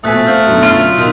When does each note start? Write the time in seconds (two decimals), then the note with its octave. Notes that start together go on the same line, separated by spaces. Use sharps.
0.04 A#1 B2 A3 G#5 D#6 F#6 B6
0.27 C4 F5 F6 G6 F#7
0.47 F#2 B2 D3
0.63 F4
0.97 B1 D#3 E6 D#7 F7